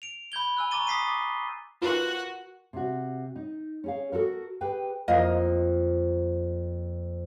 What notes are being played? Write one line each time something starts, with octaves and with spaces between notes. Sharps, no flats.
D7 F7
B5 G6 G#6 G7
G#5 E6 F#6
A#5 C#6 D6 A6 D#7 G7
D#6 A6 B6 C7 D#7
D6
F4 F#4 A#4 B4 F#5
C3 F#4
D#4
C#4 G#4 F5
F#4 A4 A#4
G4 G#4 B4 G5
F2 A#3 A#4 D#5 F5